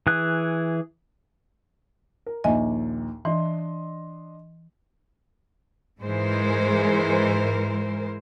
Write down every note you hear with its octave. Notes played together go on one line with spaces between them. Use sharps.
E3 G#4 F#6
A#4
A#1 D#2 A#2 D#5 E5 G#5
E3 D4 D#5 C6
G#2 E3 G#3 A#4 C5